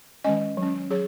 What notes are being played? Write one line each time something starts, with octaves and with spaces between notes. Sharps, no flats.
D#3 G#3 C#4 D#5 G#5
F#3
C#4
F#3 G#4 C#5